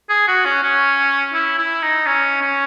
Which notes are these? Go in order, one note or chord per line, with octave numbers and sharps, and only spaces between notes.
G#4
F#4
C#4
C#4
E4
E4
D#4
C#4
C#4